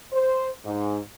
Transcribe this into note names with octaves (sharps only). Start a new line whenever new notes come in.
C5
G#2